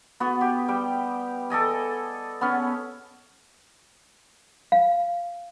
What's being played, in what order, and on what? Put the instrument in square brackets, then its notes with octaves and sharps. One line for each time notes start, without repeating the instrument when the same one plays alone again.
[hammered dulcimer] B3 F#4
G4
G3 G5
A4 D5 D#5 G#5
B3 C#4
[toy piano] F5